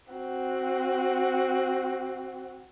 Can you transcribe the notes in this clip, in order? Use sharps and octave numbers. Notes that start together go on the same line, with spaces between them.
C4 F#4